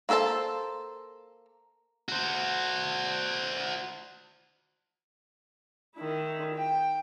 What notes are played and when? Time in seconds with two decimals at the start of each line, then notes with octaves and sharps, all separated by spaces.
0.09 A#3 F#4 A4 C5 A5
2.09 F#4 C5
5.97 D#3 E4
6.55 G5